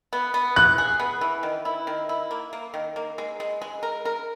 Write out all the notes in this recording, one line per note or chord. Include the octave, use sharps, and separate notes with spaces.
B3
B3
E3 F#6
G#4
B3
E3
D#3
E4
D#3
E4
A#3
A#3
D#3
A#3
G#3
G#3
G#3
A#4
A#4